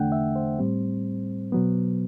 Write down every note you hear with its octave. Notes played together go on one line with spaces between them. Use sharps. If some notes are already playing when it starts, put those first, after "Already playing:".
Already playing: E2 D3 A3 D4 F#5 G5
E5
C5
A2 G3 C4
B2 F#3 B3